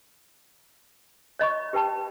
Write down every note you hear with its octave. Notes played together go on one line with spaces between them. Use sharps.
C#5 D#5 B5 C#6
G4 B4 G5 A5 B5